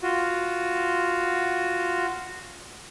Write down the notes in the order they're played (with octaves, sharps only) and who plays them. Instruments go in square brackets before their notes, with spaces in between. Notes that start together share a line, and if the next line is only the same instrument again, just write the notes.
[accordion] F4 F#4